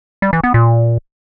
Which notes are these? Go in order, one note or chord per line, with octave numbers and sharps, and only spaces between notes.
G3
E3
B3
A#2